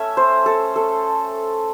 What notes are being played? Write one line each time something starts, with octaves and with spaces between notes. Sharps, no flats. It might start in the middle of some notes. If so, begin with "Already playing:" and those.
Already playing: A3 C#4 E5
C5
A4
A4